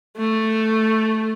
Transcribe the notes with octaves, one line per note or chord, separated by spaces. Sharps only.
A3